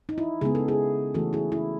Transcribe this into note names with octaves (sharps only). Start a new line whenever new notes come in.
D#4
E4
C#3 G#3 B3 G#4
A4
E4 G#4
E3 A3 C#4 F#4 A4
E4 G#4
E4